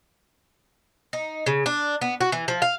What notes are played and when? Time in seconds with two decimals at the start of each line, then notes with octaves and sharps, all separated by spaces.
1.13 D#4
1.46 C#3
1.66 D4
2.01 B3
2.21 F#4
2.32 E3
2.48 F3
2.62 F5